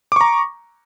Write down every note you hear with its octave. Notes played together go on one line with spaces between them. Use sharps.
A#5 C#6 D6